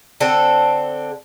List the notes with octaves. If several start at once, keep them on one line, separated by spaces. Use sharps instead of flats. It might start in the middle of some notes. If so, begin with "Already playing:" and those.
D3 C4 A4